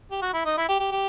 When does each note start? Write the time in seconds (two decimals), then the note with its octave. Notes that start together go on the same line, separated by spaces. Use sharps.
0.11 G4
0.22 F#4
0.34 E4
0.45 D#4
0.57 E4
0.69 G4
0.80 G4
0.91 G4